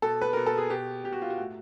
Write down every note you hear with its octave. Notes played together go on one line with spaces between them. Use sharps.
B2 A4
B4
B2 A#4
A4
G#4
B2 G4
B2 G4
F#4
F4
F#4
A2